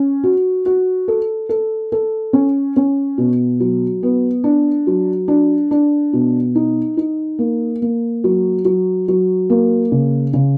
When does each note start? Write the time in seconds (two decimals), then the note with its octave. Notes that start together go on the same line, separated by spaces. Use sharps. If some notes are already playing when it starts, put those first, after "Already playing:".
Already playing: C#4
0.24 F#4
0.66 F#4
1.08 A4
1.49 A4
1.92 A4
2.33 C#4
2.76 C#4
3.18 B2
3.60 F#3
4.03 B3
4.44 D4
4.87 F#3
5.28 D4
5.71 D4
6.13 B2
6.55 D#4
6.97 D#4
7.39 A#3
7.82 A#3
8.24 F#3
8.65 F#3
9.08 F#3
9.50 A#3
9.92 C#3
10.33 C#3